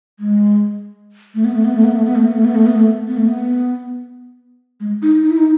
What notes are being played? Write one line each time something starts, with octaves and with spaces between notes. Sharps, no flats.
G#3
A3
B3
A3
B3
A3
B3
A3
B3
A3
B3
A3
B3
A3
B3
A3
B3
A3
B3
G#3
D#4
D#4
E4
D#4